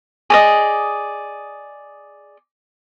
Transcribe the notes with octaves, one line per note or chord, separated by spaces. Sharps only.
G#4 D5 D#5